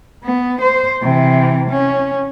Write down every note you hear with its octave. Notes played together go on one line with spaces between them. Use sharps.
B3
C5
C3 E3
C#4